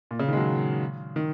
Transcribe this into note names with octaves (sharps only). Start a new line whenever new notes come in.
A#2
C#3
D#3
G#3
F#3
D#3